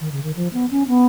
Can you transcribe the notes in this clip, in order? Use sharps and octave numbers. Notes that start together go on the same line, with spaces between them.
D#3
C#3
D#3
F3
B3
C#4
B3